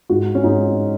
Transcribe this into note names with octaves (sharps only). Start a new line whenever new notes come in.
G#2 F#4
C#4
G#2 D#4